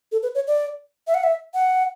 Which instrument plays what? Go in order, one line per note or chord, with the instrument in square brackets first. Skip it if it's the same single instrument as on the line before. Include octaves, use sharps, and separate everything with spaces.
[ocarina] A4
B4
C#5
D5
E5
F#5
E5
F#5